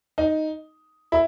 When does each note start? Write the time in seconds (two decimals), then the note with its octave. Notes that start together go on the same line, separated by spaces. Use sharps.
0.18 D#4
1.12 E4